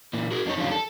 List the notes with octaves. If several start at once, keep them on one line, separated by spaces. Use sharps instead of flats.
A#2 E3 A#3
F#4 G#4 A#4
F2 A#3 D4 D#4 C#5
F2 D3 D#3 G3 C#4 F4
A4